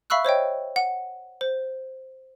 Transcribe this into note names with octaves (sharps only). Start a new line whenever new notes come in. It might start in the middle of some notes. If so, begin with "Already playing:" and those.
E5 F5 B5 C#6 E6 F#6
C5 C#5 D#5 G5
F#5
C5